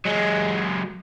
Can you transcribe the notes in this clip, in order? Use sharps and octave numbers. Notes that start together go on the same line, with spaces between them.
F#3 G#3